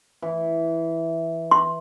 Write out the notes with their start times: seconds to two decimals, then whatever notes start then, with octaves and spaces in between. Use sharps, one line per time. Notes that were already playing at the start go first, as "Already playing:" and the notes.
0.22 E3
1.51 C6